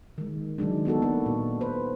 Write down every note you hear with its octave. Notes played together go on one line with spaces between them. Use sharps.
D#3 G#3
D#3 F#3 G#3 D4
B3 D#4 F#4 A4
A#3 D4 F#4 B4
A#2
B4 C5